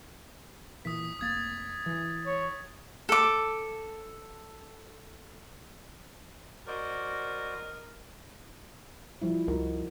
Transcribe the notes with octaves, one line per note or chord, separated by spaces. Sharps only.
A#2 E3 D#6 B6
F1 A#3 D#6 G#6 A6
E3
C#5
A4 D6
F#4 A#4 C5 D5 D#5
F3 G3 E4
C#2 D#4 F#4 A#4